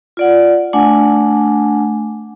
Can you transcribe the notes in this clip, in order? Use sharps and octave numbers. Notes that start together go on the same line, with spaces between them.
F4 D5 F#5
A3 D4 F#5 G#5